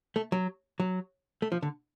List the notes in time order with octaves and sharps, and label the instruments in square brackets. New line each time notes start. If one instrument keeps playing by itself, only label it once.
[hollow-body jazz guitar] A3
F#3
F#3
A3
F3
D3